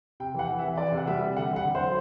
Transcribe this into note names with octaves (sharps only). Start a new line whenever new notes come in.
C3 G5
E3 F#5
E3
E5
E3
E3 D5
C3
F#5
G3 E5
C3
D3 F#5
D3
F#5
D3
C5
F#3